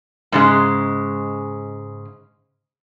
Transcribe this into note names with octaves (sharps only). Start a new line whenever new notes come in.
G#2 C#3 G#3